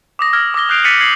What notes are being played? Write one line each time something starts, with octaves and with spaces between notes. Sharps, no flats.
D6 D#6 A#6
E6 F6 G#6 A#6
D6 E6 A#6 G7
D#6 F#6 G6 C7 D7 F7
A6 B6 C#7 D#7 F#7
G#6 C7 F#7